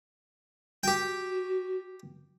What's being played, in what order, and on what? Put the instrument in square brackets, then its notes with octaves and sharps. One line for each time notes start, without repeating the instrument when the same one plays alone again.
[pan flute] F#4 [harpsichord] G4 G5